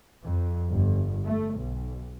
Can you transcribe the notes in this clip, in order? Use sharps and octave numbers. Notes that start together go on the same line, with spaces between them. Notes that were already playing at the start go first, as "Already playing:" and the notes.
F2
G1
A3
B1